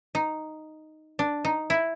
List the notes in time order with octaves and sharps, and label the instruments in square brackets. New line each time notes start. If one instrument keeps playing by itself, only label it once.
[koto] D#4
D4
D#4
E4